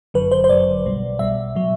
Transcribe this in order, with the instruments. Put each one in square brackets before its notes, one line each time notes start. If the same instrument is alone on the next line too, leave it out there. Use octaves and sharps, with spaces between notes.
[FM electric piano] G1 F#2 D3 F#3 B4
C5
C5
G1 F#2 D3 F#3 D5
B1 B2 G3
B1 B2 G3 E5
B2 F#3